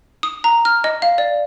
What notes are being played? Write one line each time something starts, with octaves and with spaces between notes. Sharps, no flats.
D#6
A#5
F6
D#5
F5
D5